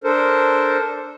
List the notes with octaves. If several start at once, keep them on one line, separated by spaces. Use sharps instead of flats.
D4 A4 A#4 C5